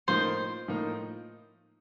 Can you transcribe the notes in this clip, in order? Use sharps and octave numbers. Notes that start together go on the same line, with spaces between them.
A2 F3 A#3 D#4 C5
A2 F3 A#3 D#4